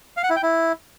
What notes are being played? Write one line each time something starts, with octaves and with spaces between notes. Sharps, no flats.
F5
F#5
E4
G5
E4